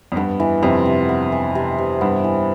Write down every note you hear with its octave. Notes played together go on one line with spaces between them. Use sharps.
F2
G2 B3
E3
F2 C3
C3
B3
E3
C3
C3
G2 B3
E3